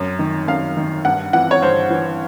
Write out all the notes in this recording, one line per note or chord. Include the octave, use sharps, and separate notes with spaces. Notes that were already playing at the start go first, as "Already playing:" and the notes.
Already playing: F#2
D#3
F#2 F5
D#3
G2 F#5
E3 F#5
C#5
G2 C5
E3